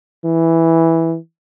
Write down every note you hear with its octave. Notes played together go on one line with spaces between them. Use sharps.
E3